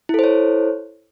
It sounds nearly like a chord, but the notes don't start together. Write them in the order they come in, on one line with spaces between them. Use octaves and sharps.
E4 A4 C5 C#5